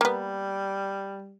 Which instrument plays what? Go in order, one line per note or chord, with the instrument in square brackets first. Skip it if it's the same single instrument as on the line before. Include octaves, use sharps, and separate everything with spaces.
[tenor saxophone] G3 [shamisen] A#3 B3